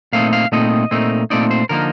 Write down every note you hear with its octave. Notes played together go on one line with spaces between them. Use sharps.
A#2 A3 C4 D#4 F5
F5
A#2 A3 C4 D#4 D#5
A#2 A3 C4 D#4
A#2 A3 C4 D#4 D5
C5
D3 F3 A#3 D#4 A#4